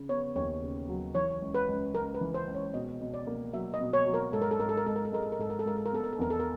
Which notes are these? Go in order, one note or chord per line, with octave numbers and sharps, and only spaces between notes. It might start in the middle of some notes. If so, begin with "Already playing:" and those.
Already playing: C#3
B3 C#5
D#2 C#5
C#3
F#3
E3 C#5
C#2
B4
C#2
C#2 A#4
B4
E3
C5
C#2
C#5
B2 D#5
B2
D5
A#3
F#3 E5
D#5
B2
C#5
F#3
A#4
G#2 A4
A#4
A4
G#2 A#4
A4
A#4
G#2 A4
A#4
A4
G#3 A#4
A4
A#4
G#2 A4
A#4
A4
G#3 A#4
A4
A#4
B3 A4
A#4
A4
E2 A#4
A4
A#4